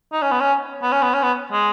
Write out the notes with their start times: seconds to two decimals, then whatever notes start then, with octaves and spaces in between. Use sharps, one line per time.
0.13 D#4
0.22 C#4
0.32 B3
0.40 C#4
0.83 B3
0.92 C#4
1.02 B3
1.13 C#4
1.23 B3
1.52 G#3